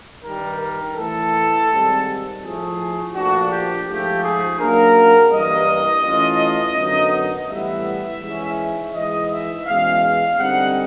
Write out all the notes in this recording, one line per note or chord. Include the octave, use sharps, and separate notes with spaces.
G2 D#3 G3 A#4
A#4
A2 E3 A3 A4
G#2 D#3 G3 C4
A2 F3 A3 G#4
A#2 F3 A3 D4 F#4
G4
G#2 F3 A3 G4
G#4
C#3 F#3 A#3 D4 A#4
G2 E3 G3 A#3 D#5
E3 A3 C#4 F4
F#2 D3 F#3 B3 D#4
A2 E3 G3 B3 E5
G#2 E3 G#3 C#4
G#2 E3 G#3 D#5
E5
E2 B2 G#3 C#4 F5
F5
D3 G3 C4 D#4 F#5